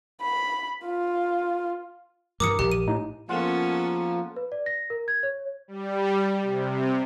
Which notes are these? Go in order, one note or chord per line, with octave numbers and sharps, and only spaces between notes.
B5
F4
G2 D#3 E3 A#4 D6 D#6 C#7
A#1 G4
D#7
A2 D#4
F3 G#3 A#3 B3 C#4 F4 A4 F#5
B4
D5
A#6
A#4
G#6
C#5
G3
C3